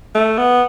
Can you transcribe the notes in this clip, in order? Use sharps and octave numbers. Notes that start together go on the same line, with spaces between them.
A3
B3